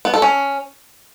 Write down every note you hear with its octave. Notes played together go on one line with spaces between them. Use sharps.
B3
A4
C#4